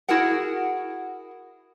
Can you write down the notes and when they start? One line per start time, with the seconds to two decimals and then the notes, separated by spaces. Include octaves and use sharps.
0.09 E4 F#4 G#4 A#4 F#5